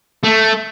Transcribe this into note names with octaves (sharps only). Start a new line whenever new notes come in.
A3